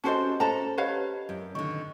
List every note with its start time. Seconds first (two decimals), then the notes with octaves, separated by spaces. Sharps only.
0.04 C#4 E4 F#4 G4 A4 C5 D#5 A5
0.40 C#4 A4 C5 A5 A#5
0.78 G4 B4 C#5 D#5 F5
1.29 F#2
1.55 D3 D#3 C#6